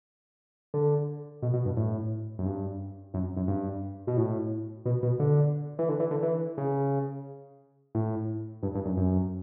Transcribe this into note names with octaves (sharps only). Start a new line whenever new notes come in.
D3
B2
B2
G2
A2
F#2
G2
F#2
F#2
G2
B2
A2
B2
B2
D3
E3
D3
E3
D3
E3
C#3
A2
G2
G2
F#2
F#2